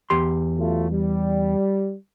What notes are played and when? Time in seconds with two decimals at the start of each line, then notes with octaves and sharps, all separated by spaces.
0.10 E2 G4 C6
0.57 F#3 A3 F4
0.91 G3